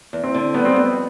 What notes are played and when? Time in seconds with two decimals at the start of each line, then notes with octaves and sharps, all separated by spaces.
0.13 E2
0.24 C4
0.34 D3
0.54 G3 B3
0.65 C4
0.74 F2 B3